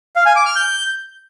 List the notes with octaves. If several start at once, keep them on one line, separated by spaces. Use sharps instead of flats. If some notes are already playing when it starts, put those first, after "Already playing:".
F5
G#5
D6
F6
G6